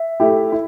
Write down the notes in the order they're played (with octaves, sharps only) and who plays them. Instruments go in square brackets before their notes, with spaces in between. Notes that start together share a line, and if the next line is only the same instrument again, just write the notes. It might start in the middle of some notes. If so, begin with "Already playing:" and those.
Already playing: [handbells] E5
[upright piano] A3 E4 G4
E4